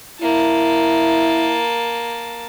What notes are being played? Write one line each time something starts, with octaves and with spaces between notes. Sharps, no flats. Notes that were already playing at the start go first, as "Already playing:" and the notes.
A#3 E4 A5